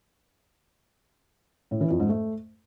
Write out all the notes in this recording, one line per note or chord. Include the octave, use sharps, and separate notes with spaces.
A2
E3
F2
G#2
A3